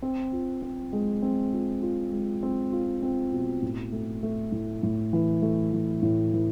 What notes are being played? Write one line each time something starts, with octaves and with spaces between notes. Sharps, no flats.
C4
F4
C4
G#3
C4
F4
F4
G#3
C4
F4
C4
B2
A2
A3
A3
A2
A2
E3
A3
E3
A2
E3